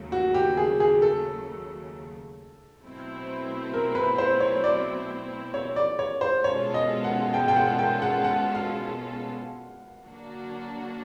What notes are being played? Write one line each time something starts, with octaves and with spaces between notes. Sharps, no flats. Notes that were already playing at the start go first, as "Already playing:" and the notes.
Already playing: D#2 C#3 F#3 A3
F#4
G4
G#4
G#4
A4
B2 F#3 A3 C4 E4
A#4
B4
C5
C#5
D5
C#5
D5
C#5
C5
B2 G#3 C#4 F4 A4 C#5
D#5
F#5
G5
G5
F#5
G5
F#5
F#5
F5
D3 F#3 A#3 D4 F#4